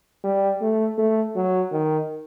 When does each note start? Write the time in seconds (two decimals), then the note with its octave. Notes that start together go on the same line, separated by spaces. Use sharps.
0.24 G3
0.61 A3
0.98 A3
1.35 F#3
1.72 D#3